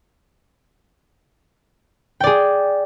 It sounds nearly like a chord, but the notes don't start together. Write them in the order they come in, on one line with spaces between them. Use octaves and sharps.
G5 D5 G#4